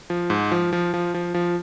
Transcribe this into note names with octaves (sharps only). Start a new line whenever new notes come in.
F3
G#2
F3
F3
F3
F3
F3